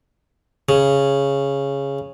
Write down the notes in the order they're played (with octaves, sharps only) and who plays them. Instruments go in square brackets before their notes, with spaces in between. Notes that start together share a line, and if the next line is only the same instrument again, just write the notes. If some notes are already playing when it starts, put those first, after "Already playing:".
[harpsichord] C#3